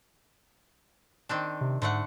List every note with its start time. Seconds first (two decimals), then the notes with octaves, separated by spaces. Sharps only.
1.29 D#3 C4 D4
1.61 C3
1.82 G#2 D3 A3 F#5